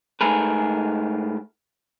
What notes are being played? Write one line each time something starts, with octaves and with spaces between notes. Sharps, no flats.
G#2 A3 G#4 A#4 B4